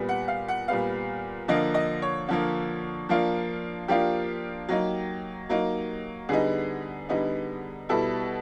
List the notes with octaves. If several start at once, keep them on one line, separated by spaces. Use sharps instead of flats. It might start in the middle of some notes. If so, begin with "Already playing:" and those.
Already playing: A#2 G3 B3
F#5
F5
F#5
A#2 G3 B3 F5
D3 F3 A#3 D#5
D#5
C#5
D3 F3 A#3
F3 A#3 D4 F4
F3 A#3 D4 F4 G4
F#3 A#3 D#4
F#3 A#3 D#4
D3 G3 B3 D#4 G#4
D3 G3 B3 D#4
B2 G3 B3 E4 A4